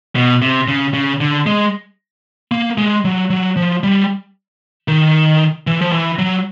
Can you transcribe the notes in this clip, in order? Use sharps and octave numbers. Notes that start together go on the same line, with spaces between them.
B2
C3
C#3
C#3
D3
G#3
A#3
G#3
F#3
F#3
F3
G3
D#3
E3
F3
E3
F#3